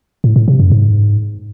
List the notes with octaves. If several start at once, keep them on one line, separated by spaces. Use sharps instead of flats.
A2
A2
C3
F#2
G#2